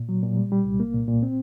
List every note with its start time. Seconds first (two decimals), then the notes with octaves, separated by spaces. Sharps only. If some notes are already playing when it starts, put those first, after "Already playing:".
Already playing: A#2
0.09 F#3
0.23 A#2
0.37 G3
0.52 G3
0.65 C2
0.80 A#3
0.94 A#2
1.08 A#2
1.23 C4